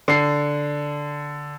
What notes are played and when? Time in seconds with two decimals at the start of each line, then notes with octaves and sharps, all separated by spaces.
0.08 D3 C7